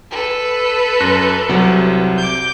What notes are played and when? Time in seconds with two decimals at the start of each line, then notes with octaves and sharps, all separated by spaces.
0.11 A4 B4
1.00 F#2 F#6 A#6
1.49 C2 C3 F#3
2.18 D6 G6